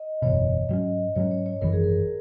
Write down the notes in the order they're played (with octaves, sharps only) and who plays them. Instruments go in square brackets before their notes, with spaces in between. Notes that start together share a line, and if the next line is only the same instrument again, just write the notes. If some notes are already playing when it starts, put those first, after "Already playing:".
Already playing: [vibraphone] D#5
[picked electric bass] F#1 E2 B2 [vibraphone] C#5
[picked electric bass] G#2 F#3 C#4 [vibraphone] D#5
[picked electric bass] G#2 F#3 C#4 [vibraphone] C#5
[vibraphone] C#5
C#5
[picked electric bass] G#1 F#2 E3 [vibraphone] A#4
[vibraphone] G#4
A#4